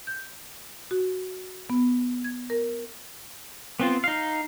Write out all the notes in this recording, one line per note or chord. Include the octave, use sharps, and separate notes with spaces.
G6
F#4
B3
G#6
A#4
B3 C4 F4
D#4 F5